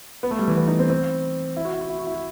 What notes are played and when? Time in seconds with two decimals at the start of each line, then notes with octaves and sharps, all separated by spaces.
0.23 B3
0.31 A3
0.39 G3
0.48 E3
0.57 B3
0.68 D#4
0.79 C4
0.90 C4
1.57 E4
1.65 F#4
1.73 E4
1.81 F#4
1.89 E4
1.99 F#4
2.07 E4
2.15 F#4